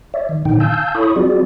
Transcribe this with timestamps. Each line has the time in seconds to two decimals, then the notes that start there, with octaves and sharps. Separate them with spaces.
0.14 C#5 D5 E5
0.29 D#3
0.45 A#2 D3 D#3 D#4 G5
0.60 F5 G#5 A5 E6 G6
0.95 E4 A4 C#5 B5 C#6 D#6
1.16 F#3 C4 F4 F#4 G#4 D5